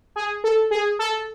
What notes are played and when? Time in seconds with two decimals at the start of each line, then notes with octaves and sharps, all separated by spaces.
0.16 G#4
0.44 A4
0.71 G#4
0.99 A4